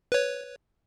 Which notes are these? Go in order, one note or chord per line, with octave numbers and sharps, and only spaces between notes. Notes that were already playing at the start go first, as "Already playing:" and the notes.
B4 C#5